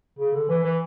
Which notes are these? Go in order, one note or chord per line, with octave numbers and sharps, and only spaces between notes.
C#3
D3
E3
E3